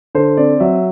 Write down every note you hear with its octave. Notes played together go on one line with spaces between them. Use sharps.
D3 C5
C4 D5
F#3 E5